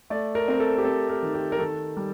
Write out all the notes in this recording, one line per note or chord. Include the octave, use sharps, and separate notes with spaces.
A3 D5
A#4
C4 A#4
A4
G4
C4 A4
A#4
D#3
G4
A#4
D#3 A4
G3